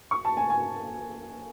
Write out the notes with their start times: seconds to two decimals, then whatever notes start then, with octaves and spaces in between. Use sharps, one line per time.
0.11 C#6
0.25 A5
0.37 G#5
0.50 G#5